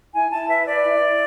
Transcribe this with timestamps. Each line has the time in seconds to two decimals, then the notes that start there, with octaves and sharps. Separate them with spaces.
0.13 E4 G#5
0.30 E4 A5
0.48 B4 E5
0.66 B4 D5
0.83 E4
1.01 E4